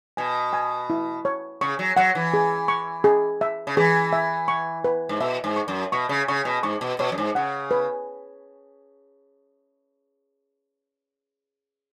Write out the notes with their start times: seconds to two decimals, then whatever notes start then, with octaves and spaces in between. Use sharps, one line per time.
0.17 B2 G#5
0.53 G#5
0.90 E4
1.25 C#5
1.61 C#3 C#6
1.79 F#3
1.97 F#3 F#5
2.15 E3
2.34 G#4
2.68 C#6
3.04 G#4
3.41 E5
3.67 C#3
3.77 E3 G#4
4.13 E5
4.48 C#6
4.84 B4
5.09 G#2
5.20 B2 E5
5.44 G#2
5.56 C#6
5.68 F#2
5.92 B2 C#6
6.09 C#3
6.28 C#3 C#6
6.45 B2
6.63 G#2 C#6
6.81 B2
6.99 B2 C#5
7.12 F#2
7.18 G#2
7.35 C#3 F#5
7.71 B4